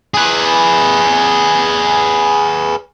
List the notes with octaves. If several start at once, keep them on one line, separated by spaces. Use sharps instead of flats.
G#4 B4